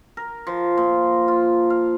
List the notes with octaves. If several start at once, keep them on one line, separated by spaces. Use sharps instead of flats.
A#4
F3
A#2
F4
F5